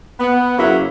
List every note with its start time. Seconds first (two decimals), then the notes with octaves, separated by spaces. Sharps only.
0.20 B3
0.58 F#2 C#3 F#3 A#3 E4 F#5